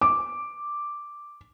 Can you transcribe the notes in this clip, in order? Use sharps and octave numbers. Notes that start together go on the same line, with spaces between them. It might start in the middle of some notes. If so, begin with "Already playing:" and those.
D6